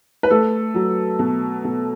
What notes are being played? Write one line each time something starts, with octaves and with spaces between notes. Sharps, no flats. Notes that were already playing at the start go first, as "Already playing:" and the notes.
B4
A3 A4
F#3
B2
B2